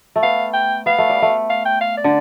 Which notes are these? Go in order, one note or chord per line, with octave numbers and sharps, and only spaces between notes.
A3
B3 F5
G5
B3 F5
A3
G3
A3
F5
G5
F5
D5
D3